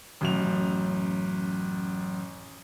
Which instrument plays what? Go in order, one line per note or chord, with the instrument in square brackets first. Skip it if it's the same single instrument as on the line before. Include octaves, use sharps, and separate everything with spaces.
[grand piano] A1 F#2 F7